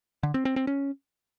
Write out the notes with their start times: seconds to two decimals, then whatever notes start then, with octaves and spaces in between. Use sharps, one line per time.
0.23 D3
0.34 C4
0.45 C4
0.56 C4
0.67 C#4